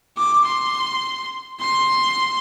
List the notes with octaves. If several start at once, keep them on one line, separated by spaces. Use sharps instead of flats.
D6
C6
C6